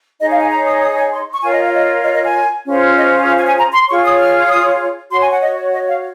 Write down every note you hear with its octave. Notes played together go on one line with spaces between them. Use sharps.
D#4 G#4 C#5 D#5
F5
G#5
A#5
D#6
D#6
G#5
C6
C#6
F4 A#4 C#5 G#5
D#5
F5
D#5
D#5
D#5
G#5
C#4 F4 G#4 C5
D#5
F5
G#5
G#5
A#5
C6
F4 G#4 C#5 C#6
D#6
F6
D#6
F#4 C#5 C6
G#5
F#5
D#5
D#5
F5